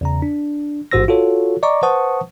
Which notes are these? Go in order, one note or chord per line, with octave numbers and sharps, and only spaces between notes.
E2 C#3 A#5
D4
A1 G#2 F#4 C5 E6 A#6
F4 F#4 A4 C#5
D5 D#5 A#5 C#6 D6
B4 C5 F#5 A5 C#6 D#6